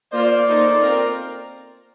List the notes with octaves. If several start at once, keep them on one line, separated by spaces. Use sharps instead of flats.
A#3 F4 C5 D5
A#3 D#4 A4 C5
C4 F4 A#4